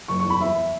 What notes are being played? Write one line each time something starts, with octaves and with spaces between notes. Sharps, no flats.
F#1 C#6
C#6
E2 B5
E3 E5